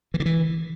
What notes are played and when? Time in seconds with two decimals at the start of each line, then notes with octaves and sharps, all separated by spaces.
0.14 E3
0.20 D3
0.26 E3